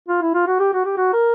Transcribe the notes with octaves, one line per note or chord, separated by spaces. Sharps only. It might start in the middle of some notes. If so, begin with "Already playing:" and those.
F4
E4
F4
F#4
G4
F#4
G4
F#4
A#4